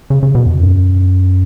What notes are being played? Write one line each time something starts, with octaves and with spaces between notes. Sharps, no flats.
C#3
C#3
B2
E2
F#2